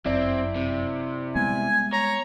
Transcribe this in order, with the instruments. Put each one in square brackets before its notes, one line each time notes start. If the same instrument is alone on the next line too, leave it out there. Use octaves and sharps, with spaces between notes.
[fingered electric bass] G1 F#2 [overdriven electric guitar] C4 [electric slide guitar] E4 D5
[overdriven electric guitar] C3
[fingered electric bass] G3 G#3 B3 [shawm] G#5
[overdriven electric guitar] C#5 [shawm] A#5